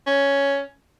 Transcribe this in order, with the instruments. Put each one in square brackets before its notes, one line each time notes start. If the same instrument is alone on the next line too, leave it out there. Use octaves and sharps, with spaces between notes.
[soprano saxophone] C#4